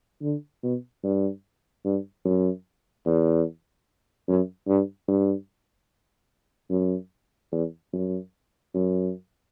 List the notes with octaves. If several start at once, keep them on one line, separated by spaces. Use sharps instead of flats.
D3
B2
G2
G2
F#2
E2
F#2
G2
G2
F#2
E2
F#2
F#2